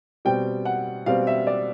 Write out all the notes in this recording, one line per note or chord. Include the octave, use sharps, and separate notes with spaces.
B2 G3 C4 G5
F#5
B2 G3 C4 F5
E5
D5